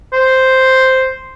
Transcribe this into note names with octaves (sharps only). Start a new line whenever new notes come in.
C5